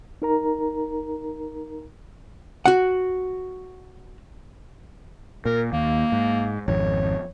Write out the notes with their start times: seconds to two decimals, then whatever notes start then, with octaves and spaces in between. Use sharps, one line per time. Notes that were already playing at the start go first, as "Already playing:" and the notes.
0.22 D#4 A#4 A#5
2.66 F#4 F#5
5.45 A#2 A#4
5.73 D#2 A#3
6.12 G#2
6.68 G#1 F2 C#5